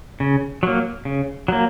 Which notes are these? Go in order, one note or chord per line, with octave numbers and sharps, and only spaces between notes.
C#3
F#3 A#3
C#3
F#3 A#3